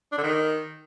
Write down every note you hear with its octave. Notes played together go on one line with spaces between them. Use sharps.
D4
D3
D#3